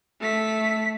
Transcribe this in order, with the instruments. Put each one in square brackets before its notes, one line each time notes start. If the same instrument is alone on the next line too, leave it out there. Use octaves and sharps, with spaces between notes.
[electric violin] A3 B6